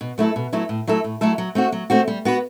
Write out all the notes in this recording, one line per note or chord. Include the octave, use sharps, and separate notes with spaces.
B2
F#3 A3 E4 A4
B2
F#3 A3 E4 A4
A2
F#3 A3 E4 A4
A2
F#3 A3 E4 A4
F#3
A3 C4 F#4
F#3
A3 C4 F#4
G3
B3 F#4 B4